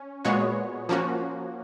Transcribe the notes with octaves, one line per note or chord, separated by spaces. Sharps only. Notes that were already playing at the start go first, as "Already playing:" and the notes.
Already playing: C#4
A#2 G#3 B3 F#4 C#5
F3 A#3 C#4 F#4